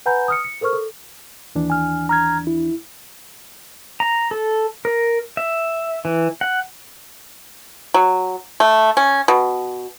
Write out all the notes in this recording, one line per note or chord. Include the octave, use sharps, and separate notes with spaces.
B4 F#5 G#5 A#5 B5 G6
D#6 F6 C#7
C#7
A4 A#4 C5 C#6 F6
A4
D#2 E3 D4
G#5 F6
A#5 F6 G#6
E4
A#5
A4
A#4
E5
E3
F#5
F#3
A3
C#4
B2